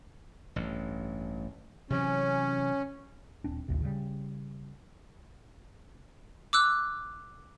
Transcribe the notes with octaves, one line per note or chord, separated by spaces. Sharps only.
A1 G2
C3 E3 F#3 C#4
D#1 C4 D4
A1 D2 C3
C#3 G3
D6 E6 F#6